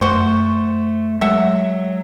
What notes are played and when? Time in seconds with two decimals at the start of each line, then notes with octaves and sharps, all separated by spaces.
0.01 F#2 A3 F#4 C5
1.21 F#3 G#3 E5 F#5